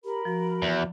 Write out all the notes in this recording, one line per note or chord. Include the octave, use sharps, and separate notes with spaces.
G4 A#4 B5
F3 F#4
E2